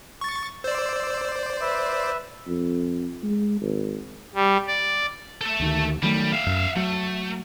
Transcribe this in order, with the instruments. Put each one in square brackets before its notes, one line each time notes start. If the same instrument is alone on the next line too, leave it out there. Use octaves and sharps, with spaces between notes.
[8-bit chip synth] C#6 A6
[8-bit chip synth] C5 D5 [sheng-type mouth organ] E6
[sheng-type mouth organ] B4 E5
[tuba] F2
G#3
G#1
[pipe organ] G3
D5
[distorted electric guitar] A4 E5
[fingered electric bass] D2 D#3
[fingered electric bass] D#3 F#3 A3 [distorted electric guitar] G3
[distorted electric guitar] E5 F5
[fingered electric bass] F#2
[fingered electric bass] F#3 [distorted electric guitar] A3